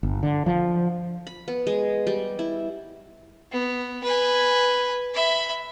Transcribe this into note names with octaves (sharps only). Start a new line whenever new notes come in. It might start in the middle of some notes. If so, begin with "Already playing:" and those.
G1
D3
F3
B5
B3
G#3
G3
E4
B3
B4 G#5
E5 B5